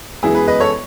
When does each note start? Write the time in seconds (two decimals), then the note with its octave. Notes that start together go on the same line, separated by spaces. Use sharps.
0.23 F#2 E3 G#3 B3 E4 G#4
0.35 G#4 B4
0.47 B4 D#5
0.60 A4 C#5